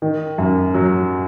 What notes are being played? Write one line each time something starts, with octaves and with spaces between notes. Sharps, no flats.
D#3
F#2
F#3